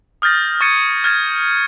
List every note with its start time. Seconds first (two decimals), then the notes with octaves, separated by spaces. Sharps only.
0.22 D#6 F6 G6 A6 A#6
0.61 C#6 F6 G#6 A6 C#7 D#7
1.04 F6 G#6 A6